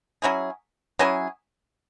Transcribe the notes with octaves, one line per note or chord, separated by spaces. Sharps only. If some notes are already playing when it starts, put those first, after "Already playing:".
F#3 C#4 E4 G#4
F#3 C#4 E4 G#4